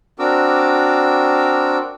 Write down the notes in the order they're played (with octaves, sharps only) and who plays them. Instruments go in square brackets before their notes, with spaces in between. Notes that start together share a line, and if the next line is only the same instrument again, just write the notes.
[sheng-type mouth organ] C4 D4 F#4 A#4 D6 E6